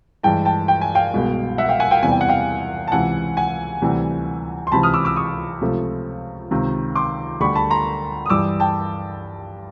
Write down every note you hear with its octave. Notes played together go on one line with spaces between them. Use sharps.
G2 E3 G#3 G5 A5
G5 A5
G5
G#5
F5 G5
C2 B2 G#3
E5 F#5
F5 G5
F#5 G#5
F5 G5
E2 C3 E3 G3 G#5
G5
F#5
F5 G5
A5
C#2 C3 E3 F#5 G#5
F#5 G#5
D2 C3 E3 G3
C6
C#2 C3 E3 A5 B5
D#6 F6
D6 E6
D6 E6
C#6 D#6
C#2 C3 F3 A3
C#2 C3 D#3
C6 D6
D2 D3 G3 B5 C#6
A5 B5
A#5 C6
D#6
G2 E3 G3 D6 E6
G5 A5